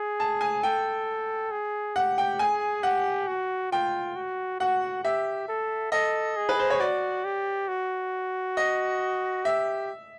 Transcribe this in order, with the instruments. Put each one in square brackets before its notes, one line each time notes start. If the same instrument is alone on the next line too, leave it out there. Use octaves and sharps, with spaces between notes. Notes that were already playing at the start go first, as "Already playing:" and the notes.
Already playing: [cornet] G#4
[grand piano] A5
G#5
[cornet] A4 [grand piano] G5
[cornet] G#4
[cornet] G4 [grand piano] F#5
[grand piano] G5
[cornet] G#4 [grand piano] G#5
[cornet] G4 [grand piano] F#5
[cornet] F#4
[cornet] F4 [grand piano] G5
[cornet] F#4
[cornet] F#4 [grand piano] F#5
[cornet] G4 [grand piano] E5
[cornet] A4
[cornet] A4 [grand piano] D#5
[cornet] G#4
[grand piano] B4
C5
C#5
[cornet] F#4 [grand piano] D5
[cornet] G4
F#4
[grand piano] D#5
[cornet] G4 [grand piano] E5